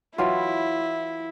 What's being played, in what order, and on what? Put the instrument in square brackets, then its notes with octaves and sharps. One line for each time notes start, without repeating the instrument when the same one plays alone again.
[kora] E3 F#3 F4 [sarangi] E4